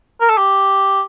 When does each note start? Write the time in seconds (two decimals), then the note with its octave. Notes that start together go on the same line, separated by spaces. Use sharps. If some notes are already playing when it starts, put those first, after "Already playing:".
0.21 A#4
0.30 A4
0.38 G4